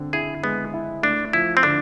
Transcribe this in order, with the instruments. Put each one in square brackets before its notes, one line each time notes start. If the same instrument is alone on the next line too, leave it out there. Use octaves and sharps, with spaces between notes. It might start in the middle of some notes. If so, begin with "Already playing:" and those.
Already playing: [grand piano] D3 C4
[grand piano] E4 [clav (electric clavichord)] G#4
[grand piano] G#3 [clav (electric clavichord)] B3
[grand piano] E4
[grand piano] A3 [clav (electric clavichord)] D4
[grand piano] F3 [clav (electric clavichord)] E4
[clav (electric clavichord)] C4
[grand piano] D3 [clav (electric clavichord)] D4